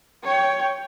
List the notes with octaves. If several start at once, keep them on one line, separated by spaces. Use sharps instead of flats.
C#5 G5